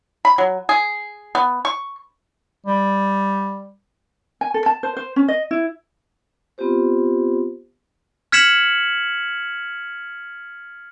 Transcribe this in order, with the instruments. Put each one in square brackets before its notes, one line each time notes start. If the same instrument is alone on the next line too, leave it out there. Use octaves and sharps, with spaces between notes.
[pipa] B5
F#3
G#4
B3
C#6
[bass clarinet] G3
[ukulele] G#5
A4
A5
C5
C5
C#4
D#5
E4
[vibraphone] B3 C4 F4 G4 C5
[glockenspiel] F6 G#6 B6 C#7 E7 F#7